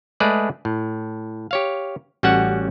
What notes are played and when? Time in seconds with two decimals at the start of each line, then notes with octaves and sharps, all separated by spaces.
0.20 G#3 A3 G#4 B4 D5
0.65 A2
1.51 G4 C#5 F5
2.23 A1 G3 C#4 F#4 F#5